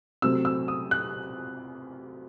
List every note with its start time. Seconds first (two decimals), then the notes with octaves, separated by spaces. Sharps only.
0.22 C3 F#3 A3 C4 E6
0.45 E6
0.68 D#6
0.91 F#6